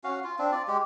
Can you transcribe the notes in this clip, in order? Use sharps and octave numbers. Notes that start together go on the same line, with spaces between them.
C#4 F#4 F5
F4
C4 D4
F4 D5
G#3 G4